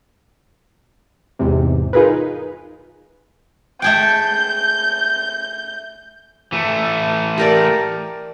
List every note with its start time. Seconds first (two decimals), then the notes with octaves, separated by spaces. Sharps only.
1.39 E2 G#2 C3
1.93 D#4 F4 G#4 A#4 B4
3.82 A3 G#4 G5 G6
6.52 E3 A3
7.38 G4 A#4 D5